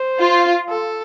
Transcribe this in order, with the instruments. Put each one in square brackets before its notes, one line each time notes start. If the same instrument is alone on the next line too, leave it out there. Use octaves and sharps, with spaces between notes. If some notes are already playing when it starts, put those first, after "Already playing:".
Already playing: [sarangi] C5
[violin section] F4
[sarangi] A4